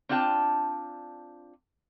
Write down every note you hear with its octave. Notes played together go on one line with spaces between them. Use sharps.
C4 D4 F4 G5 A5